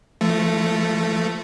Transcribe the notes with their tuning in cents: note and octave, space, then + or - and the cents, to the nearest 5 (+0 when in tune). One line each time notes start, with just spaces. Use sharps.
F3 -35 A3 +0